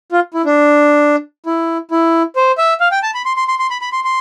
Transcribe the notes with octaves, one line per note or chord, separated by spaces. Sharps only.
F4
E4
D4
E4
E4
C5
E5
F5
G5
A5
B5
C6
C6
C6
C6
B5
B5
C6
C6